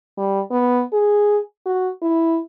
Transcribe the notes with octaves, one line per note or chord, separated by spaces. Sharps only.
G3
B3
G#4
F#4
E4